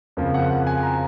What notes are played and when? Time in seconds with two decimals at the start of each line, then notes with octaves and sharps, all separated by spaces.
0.17 F2 C#3 F3 A#3
0.34 F#5
0.50 F#5
0.67 G#5
0.83 A#5